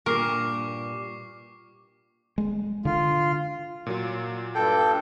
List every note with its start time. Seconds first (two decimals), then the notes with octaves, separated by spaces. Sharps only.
0.06 G2 A#2 A#4 C#6 D6 C7
2.38 G#3
2.85 D3 F4
3.86 A#2 F#3 F4
4.55 G2 A4 G5